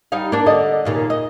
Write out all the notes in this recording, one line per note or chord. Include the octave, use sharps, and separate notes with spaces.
G3 D#4 F5
A#3 D4
D3 D5 D#5
D#2 A#2 C#3
D#5